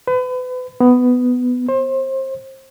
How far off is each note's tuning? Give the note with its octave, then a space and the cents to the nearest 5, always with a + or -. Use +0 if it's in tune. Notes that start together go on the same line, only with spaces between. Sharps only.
B4 +35
B3 +10
C5 +30